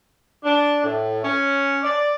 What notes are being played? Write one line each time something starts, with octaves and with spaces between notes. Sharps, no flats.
D4
A2
C#4
D5